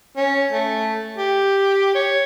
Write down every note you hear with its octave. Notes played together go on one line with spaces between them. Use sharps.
C#4
A3
G4
C#5